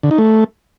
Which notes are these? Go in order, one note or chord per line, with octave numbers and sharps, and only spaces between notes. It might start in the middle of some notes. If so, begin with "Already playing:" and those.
D3
D#4
A3